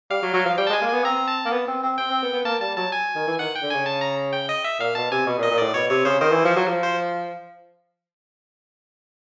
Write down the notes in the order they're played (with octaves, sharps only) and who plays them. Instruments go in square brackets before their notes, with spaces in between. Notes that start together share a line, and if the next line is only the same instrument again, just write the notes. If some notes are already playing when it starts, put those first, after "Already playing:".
[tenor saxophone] G3 [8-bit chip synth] F5
[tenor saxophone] F#3
F#3
F3
[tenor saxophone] G3 [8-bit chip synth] G5
[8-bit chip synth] A5
[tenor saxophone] G#3
[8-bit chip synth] G#5
[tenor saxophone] A#3
[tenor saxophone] B3 [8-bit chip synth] G#5
[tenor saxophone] C4 [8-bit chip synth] A#5
[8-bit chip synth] A5
[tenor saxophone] A#3
B3
C4
C4
[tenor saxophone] C4 [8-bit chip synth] G5
[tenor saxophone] C4
B3
B3
[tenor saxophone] A#3 [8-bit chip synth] A5
[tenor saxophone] G3 [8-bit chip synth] A5
[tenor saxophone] F#3 [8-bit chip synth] A5
[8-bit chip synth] G#5
[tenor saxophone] D#3
E3
[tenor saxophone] D#3 [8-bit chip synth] F#5
[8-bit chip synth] G5
[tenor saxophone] D3
[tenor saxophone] C#3 [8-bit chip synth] G#5
[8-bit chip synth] A5
A#5
G5
D#5
E5
[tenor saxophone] A#2 [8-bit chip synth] F5
[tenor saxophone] B2 [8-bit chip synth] A5
[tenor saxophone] C3 [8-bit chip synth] G#5
[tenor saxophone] B2
A#2
[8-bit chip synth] D#5
[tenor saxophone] A#2
[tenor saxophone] A2 [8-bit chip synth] D5
[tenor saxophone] B2 [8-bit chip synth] C#5
[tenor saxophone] C3 [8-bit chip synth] C#5
[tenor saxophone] C#3 [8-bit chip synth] C5
[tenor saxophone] D#3 [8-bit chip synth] C5
[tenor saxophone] E3
F3
F#3
F3
[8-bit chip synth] C5